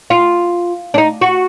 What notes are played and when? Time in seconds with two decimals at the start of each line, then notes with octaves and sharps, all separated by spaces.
0.10 F4
0.94 D4
0.98 D#4
1.21 F#4